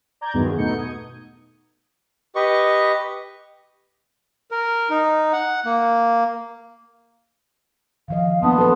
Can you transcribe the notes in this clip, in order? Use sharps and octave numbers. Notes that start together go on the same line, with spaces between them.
D5 A#5 G6 G#6
E2 G2 D#3 F#3 G#3 B3
B2 A3 B3 D#4 G6 C#7
D#6 G#6
G4 B4 D#5 C#6
A#4
D#4
F#5
A#3
D#3 F3 D#5 F5
F#3 A#3 B3 D4 A5 C6 D#6
A4 B4